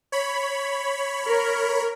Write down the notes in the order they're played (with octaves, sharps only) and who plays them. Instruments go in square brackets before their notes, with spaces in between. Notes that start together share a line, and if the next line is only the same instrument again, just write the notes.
[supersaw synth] C#5 B5
[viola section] A#4